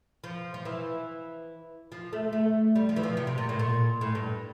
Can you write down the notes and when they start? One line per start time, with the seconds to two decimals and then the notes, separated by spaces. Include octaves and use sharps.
0.24 F3
0.54 F3
0.65 E3
1.92 F3
2.13 A3
2.33 A3
2.76 G3
2.89 F3
2.96 E3
3.03 F3
3.17 C3
3.27 C3
3.38 A#2
3.49 A2
3.59 A#2
4.01 A2
4.15 G2